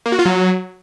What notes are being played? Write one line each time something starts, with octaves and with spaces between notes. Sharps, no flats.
A#3
F#4
F4
F#3